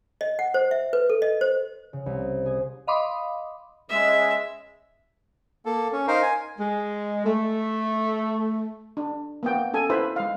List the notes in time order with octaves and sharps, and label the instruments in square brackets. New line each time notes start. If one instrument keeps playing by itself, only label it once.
[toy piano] D#5
F#5
C5
E5
B4
A4
D#5
C5
[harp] C#3
C2
G#4
[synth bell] D#5 F5 B5 C6 D6 D#6
[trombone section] C#3 G#3 [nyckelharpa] E5
[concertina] A#3 A4
C#4
D#4 A#4 C5 F5
G#5
[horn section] G#3
A3
[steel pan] D4
A#3 B3 G5
C#4 A4 G#5
E4 B4 C5 E5
G#3 F5